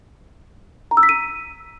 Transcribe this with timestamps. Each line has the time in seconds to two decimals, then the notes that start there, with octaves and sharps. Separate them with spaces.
0.91 A#5
0.97 E6
1.03 B6
1.09 D#7